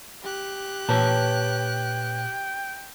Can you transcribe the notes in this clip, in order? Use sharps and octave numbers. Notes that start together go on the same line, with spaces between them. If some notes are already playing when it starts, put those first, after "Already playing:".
G4 F#6
A#2 B4 C#5 G5 A5